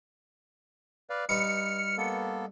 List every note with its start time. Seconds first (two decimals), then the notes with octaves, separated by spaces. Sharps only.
1.10 B4 D5 F5
1.29 G2 D#4 B4 F6 C#7
1.97 A#3 B3 A4